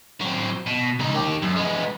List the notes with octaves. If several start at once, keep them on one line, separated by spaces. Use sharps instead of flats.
F#3 C4
B2
C#2 D#4
D#3 G4
F#2
G#3 B3